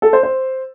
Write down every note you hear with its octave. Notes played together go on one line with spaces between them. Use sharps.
A4
C5
C5